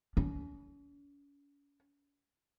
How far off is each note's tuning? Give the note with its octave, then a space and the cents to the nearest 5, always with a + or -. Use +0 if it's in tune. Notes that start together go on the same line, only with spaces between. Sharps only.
C#4 +40